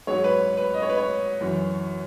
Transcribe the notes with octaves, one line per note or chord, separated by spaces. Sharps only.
G#2 F#3 C#5
B4
B4
D#5
C#5
B4
C#5
F#2 E3